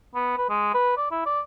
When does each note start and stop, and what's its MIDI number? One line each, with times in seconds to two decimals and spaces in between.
0.15 0.37 59
0.37 0.46 71
0.50 0.73 56
0.74 0.94 71
0.97 1.09 74
1.11 1.26 64
1.26 1.40 74